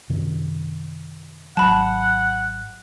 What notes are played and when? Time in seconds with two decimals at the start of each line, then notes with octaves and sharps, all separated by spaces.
0.10 F#2 C3 D#3
1.57 G#1 F#3 F#5 A5 B5